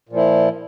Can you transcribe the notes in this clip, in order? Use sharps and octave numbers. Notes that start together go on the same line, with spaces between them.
A#2 F3 E4